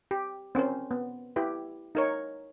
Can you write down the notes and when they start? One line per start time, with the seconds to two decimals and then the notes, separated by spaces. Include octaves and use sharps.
0.11 G4
0.55 C4 C#4 A#4 C5
0.91 B3
1.36 E4 G4 B4
1.95 D#4 A#4 C#5